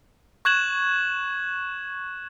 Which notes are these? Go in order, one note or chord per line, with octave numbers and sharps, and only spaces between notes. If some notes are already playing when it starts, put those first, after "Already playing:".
C#6 F#6 G#6 E7 F#7